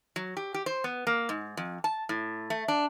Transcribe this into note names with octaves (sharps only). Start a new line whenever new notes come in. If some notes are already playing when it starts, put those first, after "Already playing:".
F#3
G4
G4
C5
B3
A#3
G#2
F2
A5
A2
A3
D4